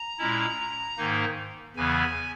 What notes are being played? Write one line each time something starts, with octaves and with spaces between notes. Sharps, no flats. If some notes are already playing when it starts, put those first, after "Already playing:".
Already playing: A#5
A#2 G#3 C#4 E4
G#2 D#3 A#3 D#4
E2 C#3 E3 B3 G#5